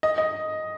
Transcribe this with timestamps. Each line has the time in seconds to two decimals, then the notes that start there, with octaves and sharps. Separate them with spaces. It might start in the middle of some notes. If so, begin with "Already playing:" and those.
0.03 D#5
0.18 D#5